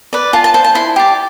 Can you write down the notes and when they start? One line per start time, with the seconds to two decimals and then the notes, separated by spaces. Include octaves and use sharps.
0.13 B4 D5
0.33 F4 A5
0.44 A5
0.54 C5 A5
0.64 A5
0.75 E4 C6
0.96 G4 D5